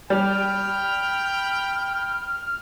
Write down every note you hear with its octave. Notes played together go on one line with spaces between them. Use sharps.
G3 G5 B5 F6